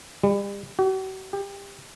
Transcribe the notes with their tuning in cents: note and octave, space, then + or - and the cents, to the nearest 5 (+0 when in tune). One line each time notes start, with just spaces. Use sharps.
G3 +40
F#4 +45
G4 +25